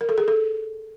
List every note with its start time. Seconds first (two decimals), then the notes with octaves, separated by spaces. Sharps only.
0.01 A#4
0.09 A4
0.18 G#4
0.28 A4